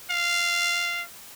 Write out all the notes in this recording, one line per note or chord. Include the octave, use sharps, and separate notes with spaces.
F5